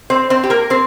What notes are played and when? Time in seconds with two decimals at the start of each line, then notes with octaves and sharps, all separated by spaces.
0.10 C4 C5
0.30 C4 C5
0.44 G4
0.50 A#3 A#4
0.70 C4 C5